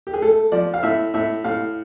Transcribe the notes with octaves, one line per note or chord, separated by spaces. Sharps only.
G4
G#4
A3 A4
F3 D5
F5
A2 E5
A2 E5
A2 F5